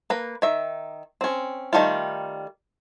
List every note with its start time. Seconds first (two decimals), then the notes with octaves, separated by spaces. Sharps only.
0.10 A#3 B4
0.42 D#3 E5
1.21 C4 C#4
1.73 D#3 G3 A3 F4